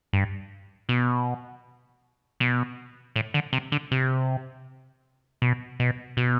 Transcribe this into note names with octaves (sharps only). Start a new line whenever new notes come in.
G2
B2
B2
A2
D3
C3
D3
C3
B2
B2
B2